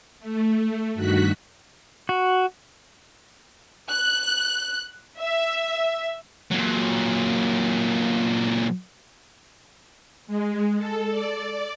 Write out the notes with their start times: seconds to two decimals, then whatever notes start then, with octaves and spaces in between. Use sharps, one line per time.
0.19 A3
0.94 G2 D#3 F#4 F#6 B6
2.09 F#4
3.91 F#6
5.20 E5
6.51 A#2 F#3
10.27 G#3
10.77 A4
11.11 D5